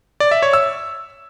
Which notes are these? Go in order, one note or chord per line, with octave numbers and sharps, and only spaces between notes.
D5
E5
C#5
E6